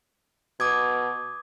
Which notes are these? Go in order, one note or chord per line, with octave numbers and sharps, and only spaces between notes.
B2 D6 D#6 G#6